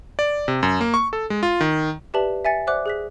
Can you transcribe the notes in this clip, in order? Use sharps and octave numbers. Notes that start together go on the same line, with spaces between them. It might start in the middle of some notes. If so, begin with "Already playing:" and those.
D5
C3
F#2
A#3
C#6
A4
G#3
F4
D#3
G4 B4 D5 E5 A5 F#7
E5 G#5 A6 C#7
C5 D5 E5 F#5 D6 F#6
G#4 F#6 B6